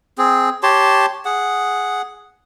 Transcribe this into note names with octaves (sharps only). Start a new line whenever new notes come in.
C4 G#4
G4 C#5 A5 C6
G#4 F#5